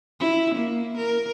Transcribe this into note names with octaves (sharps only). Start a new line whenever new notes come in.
E4
A#3
A#4